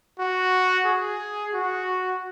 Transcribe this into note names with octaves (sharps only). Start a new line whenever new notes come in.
F#4
G#4
F#4